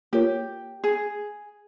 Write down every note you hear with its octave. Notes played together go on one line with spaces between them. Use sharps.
A#3 F4 G4 A#4 C#5
G#4